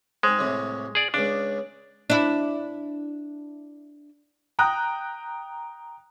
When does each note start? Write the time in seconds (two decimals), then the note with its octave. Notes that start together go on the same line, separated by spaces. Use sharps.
0.23 G#2 G#3 C4
0.39 C2 A2 C3
0.95 G#4 D5
1.14 C#2 C#3 D4
2.10 D4 E4
4.59 G5 A#5 D#6 F#6